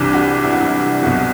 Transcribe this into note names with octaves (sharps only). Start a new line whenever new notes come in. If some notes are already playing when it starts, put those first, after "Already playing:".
Already playing: C2 C3 E3 D4
F#4
E4
F#4
E4
C2 B2 F#4